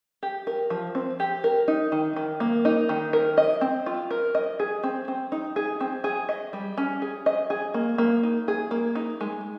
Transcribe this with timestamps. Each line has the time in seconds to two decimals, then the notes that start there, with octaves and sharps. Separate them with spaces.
0.23 G4
0.47 A#4
0.70 F3
0.95 C4
1.20 G4
1.44 A#4
1.68 D#4
1.92 D#3
2.16 D#3
2.40 A#3
2.65 D#4
2.89 D#3
3.13 A#4
3.38 D#5
3.61 C4
3.86 F4
4.11 A#4
4.35 D#5
4.60 G#4
4.83 C4
5.08 C4
5.32 D#4
5.56 G#4
5.81 C4
6.04 G#4
6.29 D#5
6.53 G3
6.78 C#4
7.02 G#4
7.26 D#5
7.50 G#4
7.74 A#3
7.98 A#3
8.23 D#4
8.48 G#4
8.71 A#3
8.95 D#4
9.21 G#3